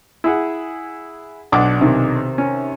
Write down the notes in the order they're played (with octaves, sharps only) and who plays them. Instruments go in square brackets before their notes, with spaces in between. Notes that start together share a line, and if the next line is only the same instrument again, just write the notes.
[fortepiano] E4 G#4 F#5
[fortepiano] B1 D4 D6 [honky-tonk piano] F#5
[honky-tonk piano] C3 D#3
[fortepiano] C#4